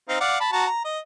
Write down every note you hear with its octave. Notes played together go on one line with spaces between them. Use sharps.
C4 D#4 F5
D5 F5 F#5
A5 B5
F#4 A5 A#5
A#5
D#5